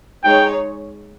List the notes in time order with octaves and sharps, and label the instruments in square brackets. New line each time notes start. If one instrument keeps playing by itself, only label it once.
[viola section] G#3 D#4 G#4 C#5 [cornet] G5